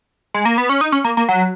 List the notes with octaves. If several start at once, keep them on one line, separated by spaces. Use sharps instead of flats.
G#3
A#3
B3
C#4
D#4
C#4
A#3
A#3
F#3